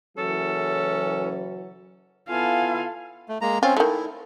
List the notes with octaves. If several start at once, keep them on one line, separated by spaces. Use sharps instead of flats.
F#1 E3 F#3 C#4 A4
B3 E4 F4 A4 F5 G#5
A3
G#3 A#3 A#5
C4 C#4 F4
D#3 A3 E4